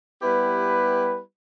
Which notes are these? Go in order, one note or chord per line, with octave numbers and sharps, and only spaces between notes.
G3 B3 E4 G4 B4